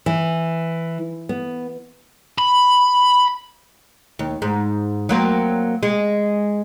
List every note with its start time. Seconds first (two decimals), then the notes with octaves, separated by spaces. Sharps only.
0.06 E3
1.29 B3
2.38 B5
4.19 D#2
4.42 G#2
5.09 F#3 A#3 C4
5.83 G#3